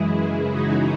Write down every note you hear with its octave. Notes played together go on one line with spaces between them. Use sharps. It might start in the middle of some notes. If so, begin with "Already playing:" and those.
Already playing: F#2 C#3 E3 G#3 E4 G#4
E4 G#4
D#4 F#4